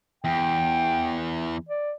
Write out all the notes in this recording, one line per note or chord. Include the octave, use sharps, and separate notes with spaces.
E2 G5
D5